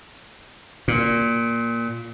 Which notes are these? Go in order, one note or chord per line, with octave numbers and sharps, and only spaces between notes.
A#2